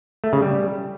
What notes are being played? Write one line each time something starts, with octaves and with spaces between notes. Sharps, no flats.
A3
C#3
G3